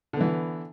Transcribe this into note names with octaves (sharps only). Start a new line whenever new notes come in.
D3 E3 B3